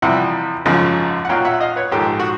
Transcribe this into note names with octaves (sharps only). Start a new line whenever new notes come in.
F2 C3 E3 G3 E5 F#5
G#1 F#2 C#3 F3
F#5
B1 A#2 F#3 F5 G5
E5 F#5
D#5 F5
B4 C#5
A#1 G#2 D#3 G4 A4
F#4